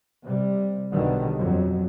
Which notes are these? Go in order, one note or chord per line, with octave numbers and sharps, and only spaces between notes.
C3 G3
B1 B2 D3 D#3 G3
A#1 F2 F#3